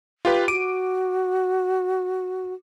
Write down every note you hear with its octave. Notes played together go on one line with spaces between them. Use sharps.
F4 G4 B4
F#4 D6 D7 D#7